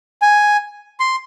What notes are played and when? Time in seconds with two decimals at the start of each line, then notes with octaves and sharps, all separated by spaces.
0.22 G#5
1.00 C6